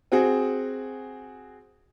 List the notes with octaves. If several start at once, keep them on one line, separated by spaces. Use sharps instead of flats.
C4 F#4 G#4